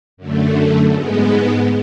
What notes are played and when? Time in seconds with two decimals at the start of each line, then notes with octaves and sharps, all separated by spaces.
0.17 F#2 D3 A3
0.92 G#2 G#3 B3